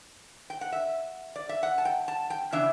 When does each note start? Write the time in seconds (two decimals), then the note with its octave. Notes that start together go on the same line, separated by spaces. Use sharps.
0.50 G5
0.61 F#5
0.72 E5
1.36 D5
1.49 E5
1.63 F#5
1.78 A5
1.85 G5
2.08 A5
2.30 G5
2.52 C#3 E3 B3 D4 E5